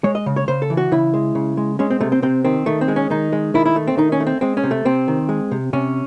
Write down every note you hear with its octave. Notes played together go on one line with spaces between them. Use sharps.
G#3 C#5
D#5
C#3
C#5
C#3 C5
A4
E3
F#4
C#3 E4
G#3
C#3
G#3
G#3 C#4
C4
C3 A3
C4
C3 C4
D#3 C4
D#3 A3
C4
G#3
C#4
D#3 D#4
G#3
D#3 E4
E4
A3
C4
D#3 D#4
C#4
A3
C4
G#3 C4
C#4
C3
A3
C3 C4
D#3
G#3
C3
C3 C#4